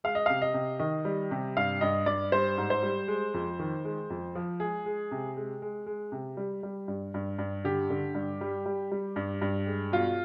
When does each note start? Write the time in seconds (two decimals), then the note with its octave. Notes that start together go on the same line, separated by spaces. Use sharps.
0.04 G#3 F5
0.15 D#5
0.26 C3 F5
0.42 D#5
0.54 C3
0.79 D#3 D#5
1.05 G3
1.31 C3
1.57 G2 F5
1.81 G2 D#5
2.06 G2 D5
2.32 G3 C5
2.58 G#2
2.70 C5
2.83 G3
3.08 G#3
3.34 F2
3.59 D#3
3.85 G#3
4.10 F2
4.35 F3
4.60 G#3 G#4
4.86 G#3
5.12 C3
5.37 G#3
5.62 G#3
5.86 G#3
6.12 C3
6.37 G3
6.63 G3
6.88 G2
7.14 G2
7.38 G2
7.64 D3 G4
7.90 D3
8.14 G2
8.41 G3
8.66 G3
8.92 G3
9.16 G2
9.41 G2
9.67 G#3
9.92 B2 F4